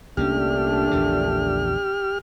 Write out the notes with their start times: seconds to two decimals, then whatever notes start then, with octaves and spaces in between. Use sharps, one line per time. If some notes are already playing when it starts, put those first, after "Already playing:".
0.17 C2 A#2 A3 A#3 C#4 D4 G4 F6
0.91 A#1 E2 C#3